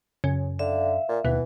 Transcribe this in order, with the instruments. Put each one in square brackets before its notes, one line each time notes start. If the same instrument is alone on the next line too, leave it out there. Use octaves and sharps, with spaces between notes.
[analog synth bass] F#2 [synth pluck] C#3
[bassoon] D3 [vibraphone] E5 F5
[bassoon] A#2
[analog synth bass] D#2 [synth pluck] B2 [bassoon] E3